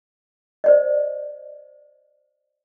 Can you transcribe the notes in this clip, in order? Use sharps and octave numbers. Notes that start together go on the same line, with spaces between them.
C5 D5 D#5